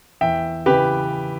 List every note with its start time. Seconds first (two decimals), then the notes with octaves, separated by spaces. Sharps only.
0.21 E2 E5 G5
0.66 C#3 E3 G4 B4